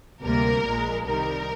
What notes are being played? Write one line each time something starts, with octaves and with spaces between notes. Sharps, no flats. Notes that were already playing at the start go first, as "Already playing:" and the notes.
D2 C3 G3 A#3 A#4
A#1 A#2 G#3
C2 C3 D#3 G3 A#4